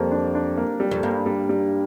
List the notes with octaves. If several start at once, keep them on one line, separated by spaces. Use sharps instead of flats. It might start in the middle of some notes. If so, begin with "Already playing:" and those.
Already playing: F2 G3 A#3
D4
D4
A#3
G3
F2
G2 A#3
G3
G3